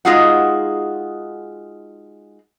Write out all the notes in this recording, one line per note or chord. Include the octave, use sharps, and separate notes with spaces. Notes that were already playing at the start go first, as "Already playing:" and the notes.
G#3 D#4 F4 F#4 G#4 F#5